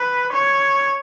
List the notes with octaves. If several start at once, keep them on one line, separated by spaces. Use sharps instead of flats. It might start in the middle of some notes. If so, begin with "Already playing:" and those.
Already playing: B4
C#5